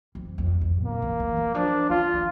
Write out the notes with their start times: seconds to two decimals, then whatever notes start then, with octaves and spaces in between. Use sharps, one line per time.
0.15 F2
0.38 F2
0.61 F2
0.85 D3 A#3
1.02 E3
1.20 E3
1.37 E3
1.54 F3 D4
1.89 E3 F4
2.13 E3